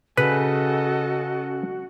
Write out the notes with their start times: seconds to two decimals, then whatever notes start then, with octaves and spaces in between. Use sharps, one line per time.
0.17 C#3 F#4 A4 B4 D#5